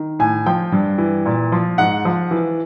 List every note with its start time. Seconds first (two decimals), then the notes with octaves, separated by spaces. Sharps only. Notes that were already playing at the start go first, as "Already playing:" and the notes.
Already playing: D#3
0.19 A2 G#5
0.46 F3 G5
0.72 G2
0.98 E3
1.26 A#2
1.52 F3
1.78 G#2 F#5
2.05 F3
2.31 E3